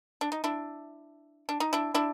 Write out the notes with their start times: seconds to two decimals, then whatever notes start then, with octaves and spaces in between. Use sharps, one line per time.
0.21 D4
0.32 D#4
0.44 D4 E4
1.49 D4
1.60 D#4
1.73 D4 E4
1.94 D4 E4